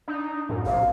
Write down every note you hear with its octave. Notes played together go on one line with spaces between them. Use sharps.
D4 D#4
F#2 A2
A#1 C3 F5